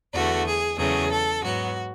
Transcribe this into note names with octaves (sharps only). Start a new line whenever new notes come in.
E2 D3 A3 F#4
G#4
E2 C#3 F#3 A3 G#4
A4
G#2 F#3 B3 F#4